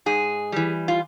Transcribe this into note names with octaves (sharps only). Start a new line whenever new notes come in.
G#2 G#4
E3 G3
F4